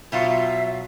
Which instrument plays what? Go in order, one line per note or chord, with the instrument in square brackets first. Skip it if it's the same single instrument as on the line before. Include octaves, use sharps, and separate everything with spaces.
[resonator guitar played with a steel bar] B2 F#3 F4 [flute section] E5